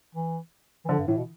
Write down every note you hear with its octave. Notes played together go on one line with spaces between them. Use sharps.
E3
E3
D3 F3
G2
A2 E3
B2